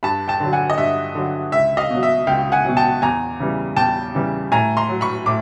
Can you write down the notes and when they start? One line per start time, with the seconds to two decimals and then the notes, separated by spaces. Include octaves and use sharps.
0.03 G2 A5 B5
0.28 G5 A5
0.40 D3 F#3
0.53 F#5 G#5
0.70 D#5
0.78 G2 E5
1.15 D3 F#3
1.52 C#2 E5
1.77 D#5 F5
1.90 B2 F#3
2.03 E5
2.27 C#2 F5 G5
2.52 F#5 G#5
2.65 B2 F#3
2.77 G5 A5
3.02 E2 G#5 A#5
3.40 C#3 E3 G3
3.76 E2 G5 A5
4.15 C#3 E3 G3
4.52 A2 G#5 A#5
4.77 A#5 C6
4.89 F#3
5.01 B5 C#6
5.26 A2 D6